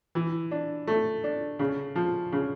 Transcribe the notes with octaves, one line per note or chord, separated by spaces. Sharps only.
E3
D4
A3
D4
C#3
F3
C#3